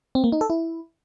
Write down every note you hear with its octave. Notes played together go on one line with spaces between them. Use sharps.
C4
A#3
D#4
A4
E4